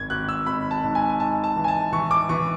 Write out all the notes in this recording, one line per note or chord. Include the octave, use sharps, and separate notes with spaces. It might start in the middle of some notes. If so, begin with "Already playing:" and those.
Already playing: G#1 G#6
G#1 F#6
E6
G#1 B5
A5
G#2
G#5
G#5
G#2 A5
A5
E3
G#5
A5
E3 C#6
D6
E3 C#6